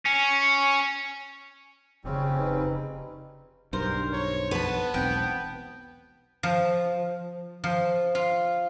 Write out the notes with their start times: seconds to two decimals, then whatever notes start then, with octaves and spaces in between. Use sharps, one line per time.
0.06 C#4
2.04 F1 C#3 G3 C4 C#4
2.38 D#4 G4 B4
3.73 B1 G2 A#4 C5
4.13 C#5
4.51 B3 B4 A5
4.94 E1 B1 C4 G5
6.43 F3
7.64 F3
8.15 F4